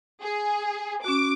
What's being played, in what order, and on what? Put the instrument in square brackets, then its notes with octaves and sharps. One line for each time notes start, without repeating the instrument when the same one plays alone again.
[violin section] G#4
[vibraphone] C#4 F#4 [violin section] D6